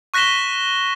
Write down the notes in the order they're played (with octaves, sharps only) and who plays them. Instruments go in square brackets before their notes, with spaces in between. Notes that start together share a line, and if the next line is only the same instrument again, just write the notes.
[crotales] C#6 F#6 A#6 B6 E7 G7